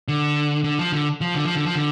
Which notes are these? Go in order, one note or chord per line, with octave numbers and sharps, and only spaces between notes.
D3
D3
F3
D3
F3
D3
F3
D3
F3
D3